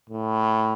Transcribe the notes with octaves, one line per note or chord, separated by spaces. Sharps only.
A2